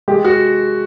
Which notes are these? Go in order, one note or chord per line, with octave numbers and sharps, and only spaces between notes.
G#3 G4
F#4